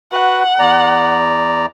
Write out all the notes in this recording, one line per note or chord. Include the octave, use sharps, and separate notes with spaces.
F#4 B4 F#5
E2 D5 A#5